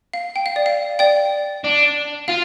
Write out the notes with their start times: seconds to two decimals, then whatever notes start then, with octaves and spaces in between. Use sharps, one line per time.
0.14 F5
0.36 G5
0.46 F5
0.56 D5
0.66 F5
0.99 D5 G5
1.64 D4
2.28 F4 F5